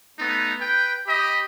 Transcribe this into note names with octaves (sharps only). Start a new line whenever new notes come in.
A3 B3 D#4
B4 G5
G4 D#5 B5